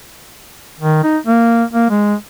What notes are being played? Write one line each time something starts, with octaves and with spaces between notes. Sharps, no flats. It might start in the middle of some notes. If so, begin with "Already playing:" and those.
D#3
D#4
A#3
A#3
G#3